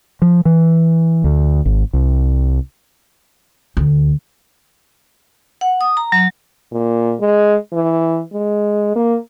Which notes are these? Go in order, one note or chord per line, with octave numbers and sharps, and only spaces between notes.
F3
E3
D2
G#1
C2
D2
F#5
D#6
A#5
F#3
A#2
G#3
E3
G#3
A#3